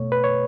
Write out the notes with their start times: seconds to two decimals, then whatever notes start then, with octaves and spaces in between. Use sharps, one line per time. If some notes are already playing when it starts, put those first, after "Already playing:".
Already playing: B2 A3 C#5
0.12 B4
0.24 C#5